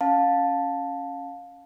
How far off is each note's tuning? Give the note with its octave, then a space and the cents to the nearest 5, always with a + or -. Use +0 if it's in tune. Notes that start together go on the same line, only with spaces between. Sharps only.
C#4 +0 F5 +25 A5 +0